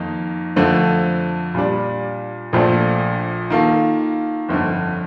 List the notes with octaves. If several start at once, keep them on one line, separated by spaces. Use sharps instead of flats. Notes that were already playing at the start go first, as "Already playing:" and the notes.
Already playing: F2 D#3 A#3 D#4
F2 D3 F3 A3 C4
A#2 G3 D4
A#1 A#2 F3 A3 D4
D#3 A#3 F4 A4
G1 F2 D3